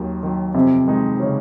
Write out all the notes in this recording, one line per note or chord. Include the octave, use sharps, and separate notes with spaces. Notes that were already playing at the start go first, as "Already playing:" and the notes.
Already playing: D#2 D#3 F#3
D#3 F#3
F2 C3 C4
D#3 G#3 D#4
C#3 C#4